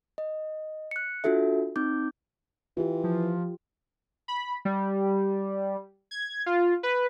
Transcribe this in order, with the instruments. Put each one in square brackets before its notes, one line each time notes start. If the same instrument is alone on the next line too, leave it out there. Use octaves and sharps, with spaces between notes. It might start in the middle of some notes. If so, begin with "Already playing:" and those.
[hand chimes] D#5
F#6 C#7
D4 F4 F#4 A4 E5
C4 D#4 D6 G6
[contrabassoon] E3 [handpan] F4 G4
[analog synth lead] F3
[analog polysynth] B5
G3
G#6
F4
B4